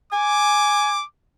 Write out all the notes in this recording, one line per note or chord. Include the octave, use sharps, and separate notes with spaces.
G#5 D6